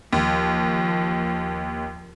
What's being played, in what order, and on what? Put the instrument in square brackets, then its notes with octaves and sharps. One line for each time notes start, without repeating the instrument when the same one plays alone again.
[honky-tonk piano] D#2 [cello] F3